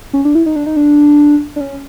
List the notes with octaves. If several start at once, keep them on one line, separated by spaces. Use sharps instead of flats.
C#4
D4
E4
D#4
D4
D#4
D4
D4
C#4